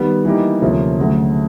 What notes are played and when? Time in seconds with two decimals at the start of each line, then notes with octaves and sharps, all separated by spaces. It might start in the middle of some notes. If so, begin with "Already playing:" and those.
Already playing: D#3 G3 B3
0.25 E3 G3 A#3 D#4 G4
0.62 D2 C3 F3 A#3 C#4
0.99 D2 C#3 F#3 A3